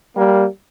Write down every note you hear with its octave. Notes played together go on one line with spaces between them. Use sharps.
G3 A#3